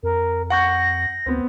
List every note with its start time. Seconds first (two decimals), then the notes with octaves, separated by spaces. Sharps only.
0.03 F2 A#4
0.50 F#5 C#6 G6 A#6
1.26 D2 B3 C4